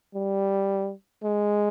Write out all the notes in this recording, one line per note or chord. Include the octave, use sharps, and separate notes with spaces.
G3
G#3